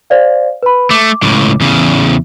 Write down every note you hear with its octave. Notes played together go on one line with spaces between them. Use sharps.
C5 D5 F5
B4 B5
A3 D6
C#2 A2
E2 C#3